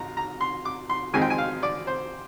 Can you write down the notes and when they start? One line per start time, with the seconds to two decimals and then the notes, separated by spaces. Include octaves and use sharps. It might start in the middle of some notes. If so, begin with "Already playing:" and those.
Already playing: G#2 F4 A#5
0.17 A#5
0.41 C6
0.65 D6
0.89 C6
1.13 F2 D#3 G#3 C4 G#5
1.22 G5
1.30 G#5
1.38 F5
1.63 D5
1.87 C5